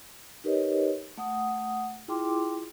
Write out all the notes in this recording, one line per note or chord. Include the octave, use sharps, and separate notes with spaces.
D#4 G4 A#4 B4 C#5 D#5
A3 F#5 D#6
E4 F4 G#4 G5 C6 D6